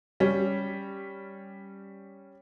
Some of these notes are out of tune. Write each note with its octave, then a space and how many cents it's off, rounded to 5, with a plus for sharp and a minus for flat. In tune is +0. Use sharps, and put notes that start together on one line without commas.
G3 +0 C#4 +0